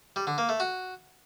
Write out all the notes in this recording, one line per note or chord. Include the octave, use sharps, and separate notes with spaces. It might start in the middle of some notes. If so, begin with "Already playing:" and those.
G3
D3
A#3
A3
F#4